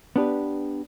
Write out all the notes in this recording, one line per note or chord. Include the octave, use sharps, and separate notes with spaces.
B3 D4 G4 B4